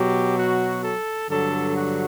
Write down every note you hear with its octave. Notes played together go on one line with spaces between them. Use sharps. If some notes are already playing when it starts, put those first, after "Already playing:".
Already playing: B2 F#3 G4
F#4
A4
G2 D3 F#3 A4
F#4